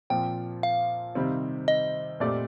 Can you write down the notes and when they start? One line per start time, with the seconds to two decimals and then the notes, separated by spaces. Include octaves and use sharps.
0.10 A#2 F3 C4 G5
0.63 F5
1.15 C3 D#3 G3 C4
1.68 D#5
2.20 A#2 A3 C4 G4 D5